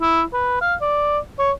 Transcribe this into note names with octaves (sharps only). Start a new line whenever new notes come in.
E4
B4
F5
D5
C#5